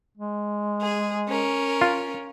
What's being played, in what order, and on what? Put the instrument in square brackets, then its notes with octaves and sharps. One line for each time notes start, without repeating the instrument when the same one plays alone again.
[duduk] G#3
[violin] G#4
C#4 A#4
[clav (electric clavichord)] F4